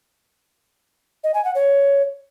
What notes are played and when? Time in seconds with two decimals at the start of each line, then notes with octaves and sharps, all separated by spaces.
1.24 D#5
1.34 G#5
1.45 F#5
1.55 C#5